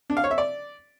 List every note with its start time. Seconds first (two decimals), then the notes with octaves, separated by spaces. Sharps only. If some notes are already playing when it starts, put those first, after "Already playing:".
0.10 D4
0.17 F5
0.24 C#5
0.31 E5
0.38 D5